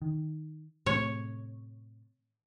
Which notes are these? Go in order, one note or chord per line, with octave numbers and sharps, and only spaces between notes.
D#3
A2 C3 A3 C#5